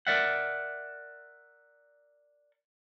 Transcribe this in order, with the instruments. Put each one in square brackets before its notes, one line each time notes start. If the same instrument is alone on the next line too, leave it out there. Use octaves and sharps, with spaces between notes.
[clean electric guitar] A#4 D5 E5 F#5